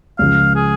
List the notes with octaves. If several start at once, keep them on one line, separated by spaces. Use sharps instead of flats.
C#2 C#3 F3 F5
G#4